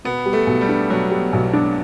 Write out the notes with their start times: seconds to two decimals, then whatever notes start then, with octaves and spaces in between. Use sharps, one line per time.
0.05 B2 B3
0.26 G3
0.33 A3
0.47 B1
0.61 G3
0.69 D4
0.90 B2 F#3
1.11 G3
1.33 B1
1.53 D4